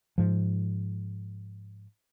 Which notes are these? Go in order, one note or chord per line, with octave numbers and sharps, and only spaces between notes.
G#2 F3